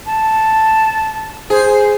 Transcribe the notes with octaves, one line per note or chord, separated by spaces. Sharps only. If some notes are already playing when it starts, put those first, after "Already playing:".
A5
G#4 C5